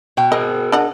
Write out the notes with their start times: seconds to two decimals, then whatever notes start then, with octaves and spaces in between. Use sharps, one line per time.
0.17 B2 G5
0.32 G#4 A#4 D#5
0.72 D4 D#5 F#5